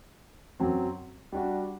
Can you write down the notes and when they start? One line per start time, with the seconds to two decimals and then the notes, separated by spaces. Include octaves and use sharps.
0.60 F#2 F#3 C4
1.32 G3 D4 F#4